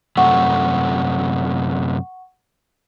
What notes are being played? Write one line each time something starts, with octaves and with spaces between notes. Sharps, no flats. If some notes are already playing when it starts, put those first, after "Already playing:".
F#2 C3 A3 F#5 C#6